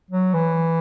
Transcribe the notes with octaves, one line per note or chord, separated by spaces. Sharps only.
F#3
E3